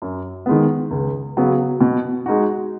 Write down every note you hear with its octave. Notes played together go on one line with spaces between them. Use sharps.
F#2
D#3 G#3 B3
C#2
C#3 F#3 B3
B2
G#3 D#4 F#4